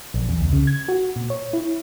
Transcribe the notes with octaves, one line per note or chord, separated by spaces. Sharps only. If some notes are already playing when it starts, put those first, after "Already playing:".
A#1
E2
C#2
C#3
G#6
F#4
A#2
C#5
E4